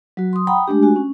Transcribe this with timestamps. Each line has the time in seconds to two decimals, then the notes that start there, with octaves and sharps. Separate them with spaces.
0.17 F#3 F#4
0.33 C6 D#6
0.47 F#5 G5 A#5 B5 D#6
0.68 G#3 A3 D4 G4
0.83 F#4 G#5
0.96 C#4